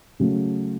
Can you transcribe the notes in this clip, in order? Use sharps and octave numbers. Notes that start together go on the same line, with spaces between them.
C#3 F#3 A3